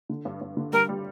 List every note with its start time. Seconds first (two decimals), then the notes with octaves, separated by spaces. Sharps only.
0.09 D3
0.25 G2
0.41 G2
0.57 D3
0.73 G3 A#4
0.89 G3